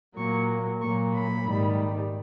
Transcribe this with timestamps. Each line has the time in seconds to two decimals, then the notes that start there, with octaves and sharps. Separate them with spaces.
0.16 A#2 F#3 A#3 C#6
0.81 A#2 F#3 A#3 C#6
1.14 B5
1.46 G#2 D#3 G3